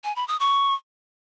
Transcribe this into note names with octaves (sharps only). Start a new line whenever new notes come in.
G#5
B5
D#6
C#6